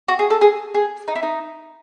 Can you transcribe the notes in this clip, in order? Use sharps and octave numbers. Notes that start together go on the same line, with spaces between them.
F#4
G#4
A4
G#4
G#4
D#4
E4
D#4